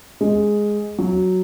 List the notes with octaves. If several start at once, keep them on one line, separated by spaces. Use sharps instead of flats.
G#3
F#3